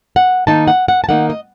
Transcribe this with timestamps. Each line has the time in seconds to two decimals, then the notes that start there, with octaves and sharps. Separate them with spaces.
0.16 F#5
0.47 D#3 A#3 D#4 A5
0.68 F#5
0.88 F#5
1.04 A5
1.08 D#3 A#3 D#4 F#5
1.30 D#5